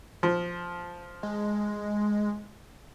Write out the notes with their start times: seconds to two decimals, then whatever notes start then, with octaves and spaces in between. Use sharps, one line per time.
0.23 F3
1.23 G#3